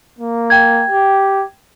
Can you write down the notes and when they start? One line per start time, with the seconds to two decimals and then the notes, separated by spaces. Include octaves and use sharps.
0.19 A#3
0.50 G5 G#6
0.90 G4